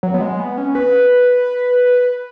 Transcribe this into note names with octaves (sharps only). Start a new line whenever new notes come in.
F#3
B3
G#3
B3
C#4
B4